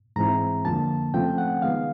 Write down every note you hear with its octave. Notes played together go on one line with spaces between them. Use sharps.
G#2 E3 G#3 C4 E4 A#5
F2 D3 F3 A#3 A5
C#3 F3 A3 C4 G5
F#5
D#3 G#3 B3 F5